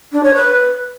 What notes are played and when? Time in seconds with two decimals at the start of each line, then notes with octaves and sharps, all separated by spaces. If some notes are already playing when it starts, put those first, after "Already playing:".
0.12 D4
0.23 C#5
0.35 B4